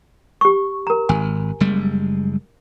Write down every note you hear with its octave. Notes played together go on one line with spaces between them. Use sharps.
G4 C#6
A#4 A#5
G#1 G#5
F#1 G3 G#3